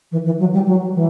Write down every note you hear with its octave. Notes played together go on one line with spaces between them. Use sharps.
E3
E3
F#3
G3
F#3
E3